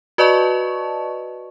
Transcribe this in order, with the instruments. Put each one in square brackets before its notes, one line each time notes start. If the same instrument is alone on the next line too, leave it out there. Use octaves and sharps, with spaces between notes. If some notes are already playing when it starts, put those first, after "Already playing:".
[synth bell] F#4 B4 D5 D#5 A5 C#6